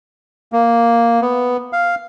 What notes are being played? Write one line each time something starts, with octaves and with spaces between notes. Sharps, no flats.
A#3
B3
F5